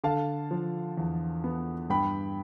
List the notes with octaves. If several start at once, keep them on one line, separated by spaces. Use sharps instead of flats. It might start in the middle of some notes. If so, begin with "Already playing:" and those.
D3 F5 A5
F3
E2
B3
G2 G5 B5